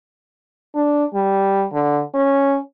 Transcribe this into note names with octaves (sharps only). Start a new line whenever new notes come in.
D4
G3
D3
C#4